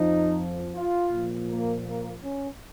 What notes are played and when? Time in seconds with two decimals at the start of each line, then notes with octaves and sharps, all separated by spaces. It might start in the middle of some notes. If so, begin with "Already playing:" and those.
Already playing: F2 F3 D#4
0.75 F4
1.12 A#2 F3
1.49 A#3
1.85 A#3
2.22 C#4